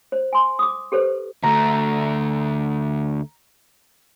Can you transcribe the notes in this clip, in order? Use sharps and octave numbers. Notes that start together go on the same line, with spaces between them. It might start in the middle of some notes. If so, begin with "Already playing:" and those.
C5
G#5 C6
D6 D#6
G4 A4 B4 C5
D2 A3 A#5